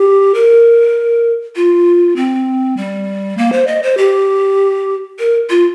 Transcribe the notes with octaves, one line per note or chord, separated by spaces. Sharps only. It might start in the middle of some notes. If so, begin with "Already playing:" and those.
Already playing: G4
A#4
F4
C4
G3
A#3
C5
D#5
C5
G4
A#4
F4